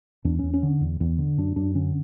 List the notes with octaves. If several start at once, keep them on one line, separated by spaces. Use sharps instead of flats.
E2 D4
E2 C#4
C#4
D3
E2
E2
D3
F#2 D4
F#2 D4
D3 C#4